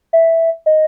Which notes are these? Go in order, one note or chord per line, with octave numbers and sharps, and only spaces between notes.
E5
D#5